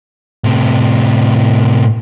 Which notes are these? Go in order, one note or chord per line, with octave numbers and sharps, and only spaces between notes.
A2 C3